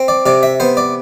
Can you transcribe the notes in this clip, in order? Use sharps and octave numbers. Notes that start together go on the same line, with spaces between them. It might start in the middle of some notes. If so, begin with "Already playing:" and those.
Already playing: C4
D5
C3 D5
E5
B3 C5
D5